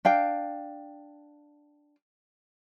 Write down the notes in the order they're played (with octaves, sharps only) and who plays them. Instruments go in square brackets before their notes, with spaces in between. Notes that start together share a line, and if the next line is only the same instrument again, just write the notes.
[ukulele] D4 F5 G5